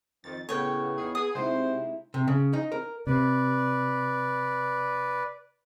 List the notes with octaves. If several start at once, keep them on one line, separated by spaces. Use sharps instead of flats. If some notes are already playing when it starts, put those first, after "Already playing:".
F2 D#3 A6
A2 C#3 B3 C#5 G5
E2 D#4 G#4
G#4 D#6
C3 G#3 C4 D#4 E4 F#4 C5
C3
C#3
D#4
A#4
C3 B4 D5